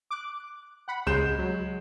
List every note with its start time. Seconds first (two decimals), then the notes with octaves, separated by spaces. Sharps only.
0.11 D6 F#6
0.88 F#5 B5
1.07 C#2 G#3 G6 E7
1.38 F#3